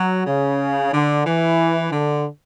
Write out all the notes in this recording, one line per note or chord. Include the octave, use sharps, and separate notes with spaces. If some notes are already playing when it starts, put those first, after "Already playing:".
Already playing: F#3
C#3
D3
E3
D3